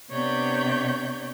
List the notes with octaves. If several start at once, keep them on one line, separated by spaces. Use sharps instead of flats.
C3 B3 D4 C#5 D5 G6